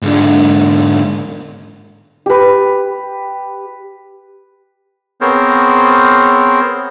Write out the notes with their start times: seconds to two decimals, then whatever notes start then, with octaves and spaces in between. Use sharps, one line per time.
0.02 G#2 D3
2.26 G4 B4
5.21 B3 C4 G#4 A#4 C5 C#5